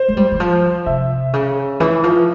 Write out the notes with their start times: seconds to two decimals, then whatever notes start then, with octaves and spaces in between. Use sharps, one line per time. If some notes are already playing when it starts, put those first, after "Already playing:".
Already playing: C5
0.08 G#3
0.17 G3
0.32 E3
0.40 F3
0.86 C3 E5
1.33 C#3
1.80 E3
2.03 F3